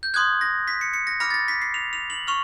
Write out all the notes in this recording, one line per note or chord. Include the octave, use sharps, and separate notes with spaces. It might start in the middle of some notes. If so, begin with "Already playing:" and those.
G6
C6 D#6 F#6 G#6
A#6
B6
C#7
C#7
A#6
B5 D6 F6 A#6
A6
A#6
B6
C7
F7
F7
F#7
C#6 F6 F7